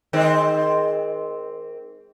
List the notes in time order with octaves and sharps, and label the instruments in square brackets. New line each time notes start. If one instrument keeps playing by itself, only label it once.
[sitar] D#3 G#3 C4